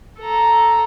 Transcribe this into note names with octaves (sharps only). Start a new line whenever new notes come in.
A4 A#5